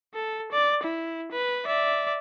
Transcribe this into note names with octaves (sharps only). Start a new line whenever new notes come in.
A4
D5
E4
B4
D5 E5